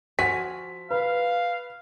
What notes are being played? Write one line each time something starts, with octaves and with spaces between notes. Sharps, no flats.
F3 F#4 G#5 B6
B4 F5